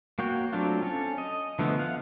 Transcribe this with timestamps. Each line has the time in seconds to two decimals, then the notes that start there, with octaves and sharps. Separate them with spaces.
0.19 A#3 F#4 C#5 G5
0.53 F#3 A3 C4 D4 F4
0.82 C#4 A4
1.18 D#5
1.59 D3 E3 F3 A3 B3
1.79 F5 F#5